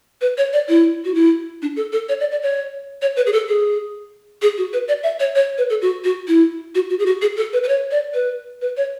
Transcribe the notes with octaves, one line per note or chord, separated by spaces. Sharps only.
B4
C#5
D5
E4
F#4
E4
D4
A4
A4
C#5
D5
D5
C#5
C#5
B4
G#4
A4
G#4
G#4
F#4
B4
D5
E5
C#5
C#5
B4
A4
F#4
F#4
E4
F#4
F#4
G#4
F#4
G#4
A4
B4
B4
C#5
D5
B4
B4
C#5